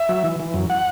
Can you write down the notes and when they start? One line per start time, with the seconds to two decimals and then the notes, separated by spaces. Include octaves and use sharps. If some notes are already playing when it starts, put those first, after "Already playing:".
Already playing: E5
0.09 F#3
0.24 E3
0.40 E3
0.54 F#2
0.70 F#5